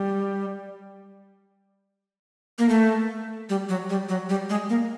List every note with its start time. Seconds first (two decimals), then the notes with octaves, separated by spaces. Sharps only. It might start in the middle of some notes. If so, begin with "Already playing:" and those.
Already playing: G3
2.59 A#3
2.69 A3
3.50 G3
3.69 F#3
3.90 G3
4.09 F#3
4.29 G3
4.50 G#3
4.70 A#3